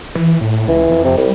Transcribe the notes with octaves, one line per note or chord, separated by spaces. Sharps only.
E3
A2
C#2 E3
F2
C3
C2 G3